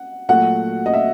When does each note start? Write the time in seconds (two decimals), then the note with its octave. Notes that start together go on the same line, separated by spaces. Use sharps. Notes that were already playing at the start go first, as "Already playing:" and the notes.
Already playing: F#5
0.29 A#2 F#3 A3 F#4 F#5
0.86 D#5
0.93 E5